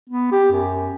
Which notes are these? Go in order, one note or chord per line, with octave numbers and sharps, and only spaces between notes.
B3
G4
F#2